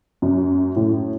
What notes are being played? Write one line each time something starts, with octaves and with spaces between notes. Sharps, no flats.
F#2
A2